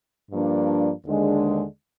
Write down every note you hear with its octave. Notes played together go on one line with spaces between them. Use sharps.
G2 F3 A#3 D4
D#2 D3 G#3 D4